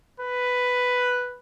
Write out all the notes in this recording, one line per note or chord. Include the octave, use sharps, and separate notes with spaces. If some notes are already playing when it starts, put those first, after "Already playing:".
B4